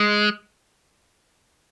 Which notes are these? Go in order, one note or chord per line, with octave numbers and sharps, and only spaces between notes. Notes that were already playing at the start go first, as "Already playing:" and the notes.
Already playing: G#3